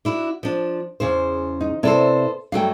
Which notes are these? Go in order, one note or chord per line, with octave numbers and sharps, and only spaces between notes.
D4 E4 F#4
F3 D4
E2 C#3 C5
D#4
C3 B3 E4 A4 C5 D5
G2 F#3 A3 F5 G5